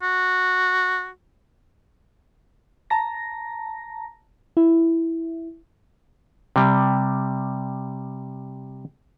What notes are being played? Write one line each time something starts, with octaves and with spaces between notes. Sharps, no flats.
F#4
A5 A#5 A#6
E4
C3 G3